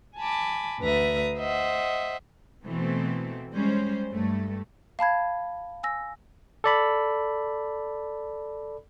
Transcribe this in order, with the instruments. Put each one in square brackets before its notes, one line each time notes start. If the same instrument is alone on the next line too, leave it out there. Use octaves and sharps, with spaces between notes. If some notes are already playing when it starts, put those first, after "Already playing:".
[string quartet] G#5 A5 B5 D6
D2 D3 B4 E5 A#5 D#6
C5 D#5 E5 F#5
[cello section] B2 E3 A3 C4
G3 G#3 C#4 C5
G2 A3
[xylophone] F5 A5 B5 G#6
G#5 E6 A#6
[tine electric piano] A4 D5 B5